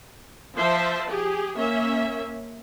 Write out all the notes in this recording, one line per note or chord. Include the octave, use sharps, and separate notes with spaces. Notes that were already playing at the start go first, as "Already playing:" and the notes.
F3 C5 E5 A5
G4 G#4
A#3 C#4 E5